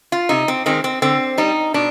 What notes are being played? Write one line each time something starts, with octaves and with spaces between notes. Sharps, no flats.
F4
C3 D#4
C4
D#3 G#3 C4
C4
D3 C4
G3 D#4
B2 D4